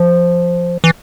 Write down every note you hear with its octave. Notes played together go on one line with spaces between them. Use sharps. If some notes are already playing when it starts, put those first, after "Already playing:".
Already playing: F3
E3